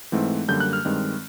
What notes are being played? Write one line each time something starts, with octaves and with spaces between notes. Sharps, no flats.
G#2 E3 A3 C4
F#2 D3 G3 A#3 G6
F#6
F6
G2 D#3 G#3 C4